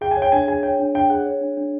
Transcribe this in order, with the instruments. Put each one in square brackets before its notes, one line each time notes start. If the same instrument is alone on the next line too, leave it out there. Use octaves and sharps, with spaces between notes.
[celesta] G#4 [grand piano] G5
[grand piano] G#5
[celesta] C#5
[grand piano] G5
[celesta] D4 [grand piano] G#5
[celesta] G#4 [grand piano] G#5
[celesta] C#5 [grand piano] G5
[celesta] D4
[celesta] D4 [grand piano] G5
[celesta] G#4 [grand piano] F#5
[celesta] C#5
D4
D4